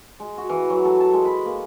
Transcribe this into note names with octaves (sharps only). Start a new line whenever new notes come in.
G#3
F#4
E3
F#3
A4
A5
G#3
B5
A#3